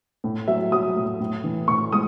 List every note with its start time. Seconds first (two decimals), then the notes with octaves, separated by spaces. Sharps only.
0.24 A2
0.48 F#3 E5
0.72 F#3 D#6
0.96 A2
1.20 A2
1.44 E3
1.68 A2 C#6
1.92 G#3 D#6